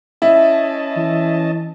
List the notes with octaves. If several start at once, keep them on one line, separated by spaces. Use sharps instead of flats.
C#4 E4 D#5 A5
E3